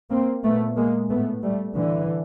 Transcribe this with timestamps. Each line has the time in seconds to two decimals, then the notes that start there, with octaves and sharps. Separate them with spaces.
0.10 A#3 C4
0.43 A#2 A3 B3
0.76 G#3 A#3
1.09 A2 A3 B3
1.43 G3 A3
1.75 A2 D3 E3